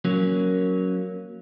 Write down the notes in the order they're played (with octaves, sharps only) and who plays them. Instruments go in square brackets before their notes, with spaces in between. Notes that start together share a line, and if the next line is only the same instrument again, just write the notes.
[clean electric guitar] F#3 A#3 C#4